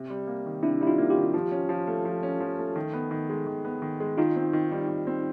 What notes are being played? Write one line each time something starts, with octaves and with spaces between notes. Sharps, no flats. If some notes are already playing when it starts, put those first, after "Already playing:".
Already playing: C3
G3
A#3
D#3
C3 D4 E4
G3 E4
D#4 F4
A#3
F4 G4
D#3
F3
C#4
F3
A3
F3
C#4
F3
A3
D#3
B3
D#3
G#3
D#3
B3
D#3
G#3
D#3 D#4 F4
C4
D#3
G3
D#3
C4